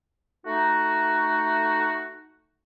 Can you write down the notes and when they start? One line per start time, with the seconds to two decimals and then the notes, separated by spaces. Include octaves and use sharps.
0.46 A3 D#4 F#4